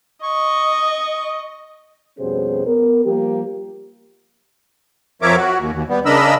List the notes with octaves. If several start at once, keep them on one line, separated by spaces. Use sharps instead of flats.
D#5 C#6
F2 B2 G3 C#4 G#4 C5
B3 A#4
F3 G3 A#3 G4
F2 F3 A#4 C#5 E5 D6
F#4
D#2
D#2
G3 B3
C#3 D4 A#4 D#5 B5 E6